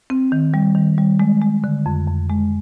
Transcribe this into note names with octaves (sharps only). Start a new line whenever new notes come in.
C4
D#3
G3
D#3
G3
G#3
G#3
D3
F2
F2
G#3